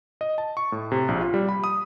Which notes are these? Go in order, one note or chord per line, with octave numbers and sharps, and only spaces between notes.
D#5
A5
C#6
A2
C3
A#1
F4
G3
B5
D#6